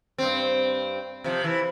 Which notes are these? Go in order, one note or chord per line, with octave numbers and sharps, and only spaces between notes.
G2 C4
C3 F3
E3